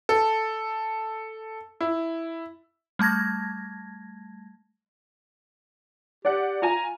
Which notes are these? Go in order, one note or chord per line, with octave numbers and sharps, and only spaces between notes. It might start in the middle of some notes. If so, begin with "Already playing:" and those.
A4
E4
G3 A3 A5 G#6 A#6
G4 D5 F#5
F4 G#5 A#5